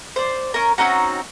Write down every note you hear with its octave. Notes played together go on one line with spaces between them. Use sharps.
C5 D5
C#4 A#4
C4 C#4 D#4 F#4